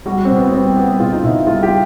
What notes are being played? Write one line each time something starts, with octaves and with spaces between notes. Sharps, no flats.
G3 F#4
B2 C4
B3
G3 C4
G3 B3
B2 F4
D#4
B2 E4
G3 F4
G4